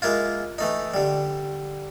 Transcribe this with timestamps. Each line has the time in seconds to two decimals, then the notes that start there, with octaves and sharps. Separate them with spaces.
0.02 G#3 A#3 E4 F4
0.58 E3 A3 D#4
0.94 D3 G3